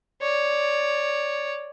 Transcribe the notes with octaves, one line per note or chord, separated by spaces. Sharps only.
C#5 D5